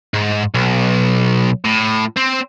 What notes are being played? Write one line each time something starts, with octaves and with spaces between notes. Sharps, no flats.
G#2
B1
A2
C4